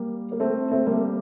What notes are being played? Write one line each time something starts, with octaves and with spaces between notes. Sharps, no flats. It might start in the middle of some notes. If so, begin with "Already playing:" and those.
Already playing: G3 A#3
A#3
A3 C4
A3 C4
G3 A#3